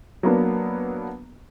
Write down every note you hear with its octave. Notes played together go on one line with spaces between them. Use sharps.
F#3 A#3 B3 D4